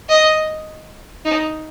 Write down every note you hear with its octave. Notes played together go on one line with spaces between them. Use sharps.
D#5
D#4